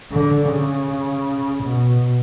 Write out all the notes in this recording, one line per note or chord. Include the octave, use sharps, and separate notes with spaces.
D3
C#3
B2